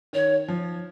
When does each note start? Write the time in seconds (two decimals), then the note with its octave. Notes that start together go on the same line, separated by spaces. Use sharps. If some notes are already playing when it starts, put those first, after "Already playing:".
0.13 D#3 C#5
0.48 F3